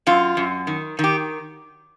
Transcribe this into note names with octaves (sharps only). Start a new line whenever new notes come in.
F#2 F4
F#2
D#3
D#3 G4